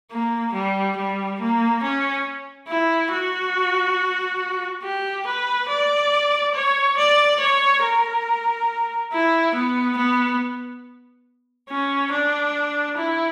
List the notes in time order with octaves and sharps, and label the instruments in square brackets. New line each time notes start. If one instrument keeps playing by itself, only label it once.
[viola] A#3
G3
G3
A#3
C#4
E4
F#4
G4
B4
D5
C#5
D5
C#5
A#4
E4
B3
B3
C#4
D4
E4